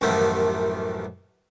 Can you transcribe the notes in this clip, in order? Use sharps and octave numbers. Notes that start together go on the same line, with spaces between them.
A1 F#2 D#3 F3 G3 A3